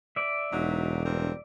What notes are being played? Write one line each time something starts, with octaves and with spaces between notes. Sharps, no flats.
D5 E5
E1 G#2 F#3 D#4
G2 C4 A#4